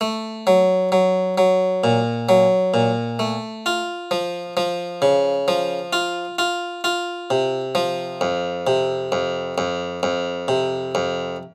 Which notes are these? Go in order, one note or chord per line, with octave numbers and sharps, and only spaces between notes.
A3
F#3
F#3
F#3
A#2
F#3
A#2
A3
F4
F3
F3
C#3
F3
F4
F4
F4
C3
F3
F2
C3
F2
F2
F2
C3
F2